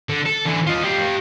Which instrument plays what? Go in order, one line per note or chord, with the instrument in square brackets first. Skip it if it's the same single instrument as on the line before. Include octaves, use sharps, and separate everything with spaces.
[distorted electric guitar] D3
A4
D3 E3
F4 D#5
G4 F5